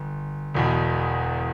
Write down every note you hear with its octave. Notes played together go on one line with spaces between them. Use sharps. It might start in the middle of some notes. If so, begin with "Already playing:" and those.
Already playing: G1
E1 E2 B2